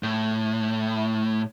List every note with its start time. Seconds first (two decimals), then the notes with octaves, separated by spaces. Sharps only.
0.03 A2